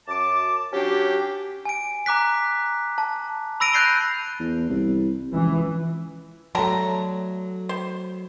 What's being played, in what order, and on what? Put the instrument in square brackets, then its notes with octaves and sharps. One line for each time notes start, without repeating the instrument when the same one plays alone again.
[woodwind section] F#2 A5 D6
F#3 C#4 D4 G4
[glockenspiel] G#5 D7
A#5 D6 F#6 B6
A5
B5 E6 A#6 D7 D#7 F7
F#6 G6 A6 C7 D7 G7
[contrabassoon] E2
C2
[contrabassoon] C#2 [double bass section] E3
[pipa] D3 A#5 [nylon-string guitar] F#3 A3 [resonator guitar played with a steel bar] A5
[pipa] C5